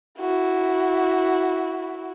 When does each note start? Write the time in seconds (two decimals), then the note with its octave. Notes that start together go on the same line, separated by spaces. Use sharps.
0.20 E4 F#4